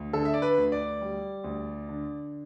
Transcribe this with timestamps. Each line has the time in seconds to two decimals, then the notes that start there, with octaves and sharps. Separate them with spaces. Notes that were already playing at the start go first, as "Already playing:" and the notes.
Already playing: D2
0.13 D3 A4
0.25 E5
0.34 D5
0.42 B4
0.58 D2
0.72 D5
1.01 G3
1.44 D2
1.89 D3